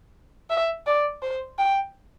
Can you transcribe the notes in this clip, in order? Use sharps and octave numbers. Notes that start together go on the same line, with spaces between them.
E5
D5
C5
G5